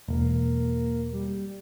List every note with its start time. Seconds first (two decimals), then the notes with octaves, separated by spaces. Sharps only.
0.08 E1 A#3
1.12 G3